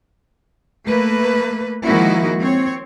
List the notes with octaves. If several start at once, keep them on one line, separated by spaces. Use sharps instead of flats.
A3 A#3 B4
D#3 F3 G#3 A#3 E4 F#4
C4 C#5